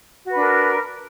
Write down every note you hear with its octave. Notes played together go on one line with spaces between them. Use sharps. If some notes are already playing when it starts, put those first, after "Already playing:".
D4 F#4 A#4 B4